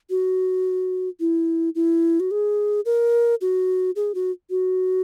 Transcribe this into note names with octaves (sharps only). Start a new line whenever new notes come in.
F#4
E4
E4
F#4
G#4
A#4
F#4
G#4
F#4
F#4